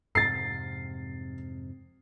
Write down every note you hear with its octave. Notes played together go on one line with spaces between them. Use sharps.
F2 G#2 C3 A6 C7